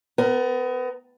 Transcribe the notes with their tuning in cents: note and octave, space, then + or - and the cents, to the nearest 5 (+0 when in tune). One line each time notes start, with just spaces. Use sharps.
B3 +30 A#4 +5